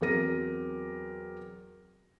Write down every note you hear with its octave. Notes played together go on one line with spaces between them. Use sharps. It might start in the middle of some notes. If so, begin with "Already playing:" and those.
E2 F#3 C4 A#4 A#6 D#7